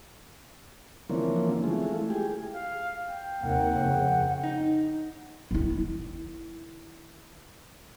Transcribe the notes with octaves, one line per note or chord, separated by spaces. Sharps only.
D3 E3 F3 A#3 C4 C#4
G#3 A3 E4 F4
G4 G#4
F5
G5
D#2 C3 A#3 F#5
F2 C#3
D#4
D#3 E4